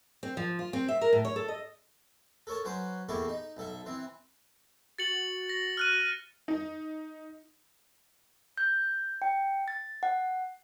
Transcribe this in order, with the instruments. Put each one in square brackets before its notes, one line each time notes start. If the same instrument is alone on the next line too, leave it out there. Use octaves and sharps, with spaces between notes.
[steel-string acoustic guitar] C4
F3
F4
C4
E5
A#4
A2
C#5
A4
D#5
[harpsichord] A4 A#4 C#5 A5
F#3 C#4 B4 C5
E2 A#3 E4 G4 A4 C#6
D#4
B1 A4 E5
E3 C4
[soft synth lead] F#4 [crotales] A6 C#7 F#7
[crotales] A#6
F6 F#6 D#7
[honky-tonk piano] D#4
[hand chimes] G6
G5
A6
F#5